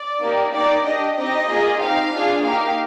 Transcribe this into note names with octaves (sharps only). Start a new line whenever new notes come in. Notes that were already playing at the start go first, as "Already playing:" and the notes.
Already playing: D5
A#3 D#4 G4
A#3 D#4 G4 D5
D4 G4 D#5
C4 D#4 G4 D#5
A#3 F4 G#4
C4 D#4 G4 F5
D4 F4 G#4
A#3 D#4 G4 F5